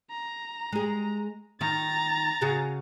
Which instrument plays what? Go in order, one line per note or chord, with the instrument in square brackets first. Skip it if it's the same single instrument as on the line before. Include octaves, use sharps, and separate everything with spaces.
[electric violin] A#5
[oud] G#3 G#4
[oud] D#3 F4 [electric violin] A#5 A6
[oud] C#3 F#4 G#4